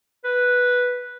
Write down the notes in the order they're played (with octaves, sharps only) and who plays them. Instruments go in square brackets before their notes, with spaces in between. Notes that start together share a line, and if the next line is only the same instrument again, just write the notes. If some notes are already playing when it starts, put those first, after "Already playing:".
[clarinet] B4